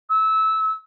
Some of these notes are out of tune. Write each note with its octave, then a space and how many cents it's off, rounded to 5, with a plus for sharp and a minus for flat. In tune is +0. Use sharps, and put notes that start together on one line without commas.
E6 -20